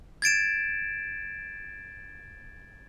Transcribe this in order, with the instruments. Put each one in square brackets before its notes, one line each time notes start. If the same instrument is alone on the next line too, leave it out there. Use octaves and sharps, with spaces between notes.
[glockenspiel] G#6 A6 D7 E7